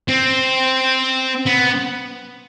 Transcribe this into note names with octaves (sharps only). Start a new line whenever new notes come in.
C4
B3